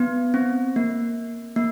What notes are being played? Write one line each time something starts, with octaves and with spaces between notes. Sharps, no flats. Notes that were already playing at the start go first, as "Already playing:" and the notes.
Already playing: B3
C4
A#3
A#3